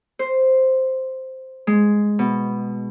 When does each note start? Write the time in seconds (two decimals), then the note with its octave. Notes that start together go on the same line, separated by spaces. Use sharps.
0.19 C5
1.67 G#3
2.19 B2